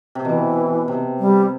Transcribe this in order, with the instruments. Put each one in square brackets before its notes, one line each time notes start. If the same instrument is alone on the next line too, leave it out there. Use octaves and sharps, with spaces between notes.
[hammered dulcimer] C3
[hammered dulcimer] B2 [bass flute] E3
[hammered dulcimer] C3
[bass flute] G3